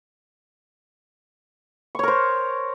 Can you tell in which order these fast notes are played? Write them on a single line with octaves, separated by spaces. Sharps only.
C#6 C#5 A#4 C5